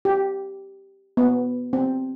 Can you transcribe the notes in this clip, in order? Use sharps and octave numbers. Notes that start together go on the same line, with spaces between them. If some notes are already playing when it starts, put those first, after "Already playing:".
G4
B3
C4